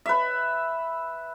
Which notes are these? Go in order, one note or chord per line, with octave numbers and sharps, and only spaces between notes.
B4 E5